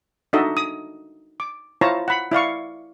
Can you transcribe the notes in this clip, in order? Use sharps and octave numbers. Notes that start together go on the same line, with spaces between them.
D4 D#4 F#4 A4 D#5 E5
D#6
D6
E4 F4 C5 C#5 A5 A#5
F#5 B5
E4 D5 F5 C#6